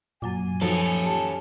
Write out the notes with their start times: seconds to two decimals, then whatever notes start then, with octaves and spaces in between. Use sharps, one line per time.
0.22 F#2 A#2 F#3 G#5 D6
0.61 F3 C#4 D#4 F#4 A4
1.05 G4 A5